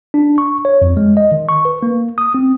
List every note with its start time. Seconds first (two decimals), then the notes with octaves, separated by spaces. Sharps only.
0.14 D4
0.38 C#6
0.65 C#5
0.82 F2
0.97 G#3
1.17 D#5
1.32 D#3
1.49 C#6
1.65 B4
1.83 A#3
2.18 D#6
2.34 C4